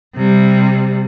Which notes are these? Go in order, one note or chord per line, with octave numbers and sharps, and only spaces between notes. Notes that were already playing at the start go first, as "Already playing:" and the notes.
C3 G3